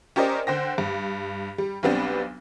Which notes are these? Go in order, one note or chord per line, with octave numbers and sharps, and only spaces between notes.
C#4 G4 A#4 C5 D5 D#5
D3 C5 G5 A#6
G2
G3
B1 G3 B3 C4 D4